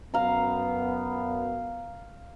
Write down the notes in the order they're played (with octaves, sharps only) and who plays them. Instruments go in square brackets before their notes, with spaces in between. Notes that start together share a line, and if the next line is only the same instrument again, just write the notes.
[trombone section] F#2 B3 [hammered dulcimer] F5 A#5